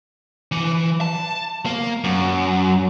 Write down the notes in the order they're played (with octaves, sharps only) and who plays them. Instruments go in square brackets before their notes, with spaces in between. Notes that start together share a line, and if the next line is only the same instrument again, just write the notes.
[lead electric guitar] E3
A5
A#3
F#2